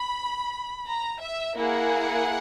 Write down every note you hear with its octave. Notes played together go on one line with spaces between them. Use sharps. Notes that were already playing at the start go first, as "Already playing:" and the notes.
Already playing: B5
A#5
E5
A#3 E4 G#4 F#5